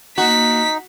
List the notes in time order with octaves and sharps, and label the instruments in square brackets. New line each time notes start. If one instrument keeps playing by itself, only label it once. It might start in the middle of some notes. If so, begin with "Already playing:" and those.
[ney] A#3 [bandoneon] D#4 [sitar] F#4 [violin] B6